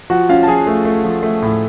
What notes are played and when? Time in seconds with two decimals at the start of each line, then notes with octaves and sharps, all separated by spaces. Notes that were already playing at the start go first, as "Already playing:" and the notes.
0.10 F3 F#4 F#5
0.29 C#4 F4 F5
0.43 A5
0.48 F3 G#4 G#5
0.67 A3
0.85 A3
1.04 F3
1.23 A3
1.42 A2